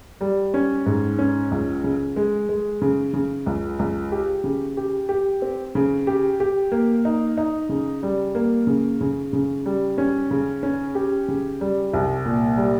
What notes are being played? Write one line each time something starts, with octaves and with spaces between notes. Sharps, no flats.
G3
C#4
G#2
C#4
C#2
C#3
G#3
G#3
C#3
C#3
C#2
C#2
G4
C#3
G4
G4
C4
C#3
G4
G4
A#3
D#4
D#4
C#3
G3
A#3
C#3
C#3
C#3
G3
C#4
C#3
C#4
G4
C#3
G3
C2
A#2
G3